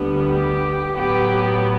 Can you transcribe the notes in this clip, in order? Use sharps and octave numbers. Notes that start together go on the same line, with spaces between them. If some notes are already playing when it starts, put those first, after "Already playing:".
Already playing: D2 D3 G3 B3
G4
A2 F#3 B3 G4